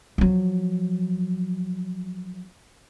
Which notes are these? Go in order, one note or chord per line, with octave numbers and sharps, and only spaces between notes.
F3 F#3